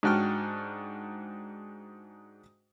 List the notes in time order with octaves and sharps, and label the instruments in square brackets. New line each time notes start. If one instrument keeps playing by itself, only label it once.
[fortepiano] G#2 D4 F#4 G5 F6